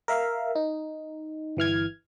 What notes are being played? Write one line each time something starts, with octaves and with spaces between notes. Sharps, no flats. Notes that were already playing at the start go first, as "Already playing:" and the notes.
A#4 E5 F5
D#4
G1 E3 F6 G#6